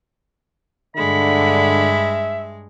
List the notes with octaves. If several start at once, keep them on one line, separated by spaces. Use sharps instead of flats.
G2 D3 G#3 E5 B5